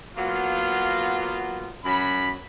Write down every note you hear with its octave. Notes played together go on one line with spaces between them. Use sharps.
F#3 A#3 B3 F4
F#2 F#3 B5